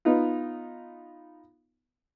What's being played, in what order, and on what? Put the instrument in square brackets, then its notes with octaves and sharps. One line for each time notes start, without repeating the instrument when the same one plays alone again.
[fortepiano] B3 D#4 F4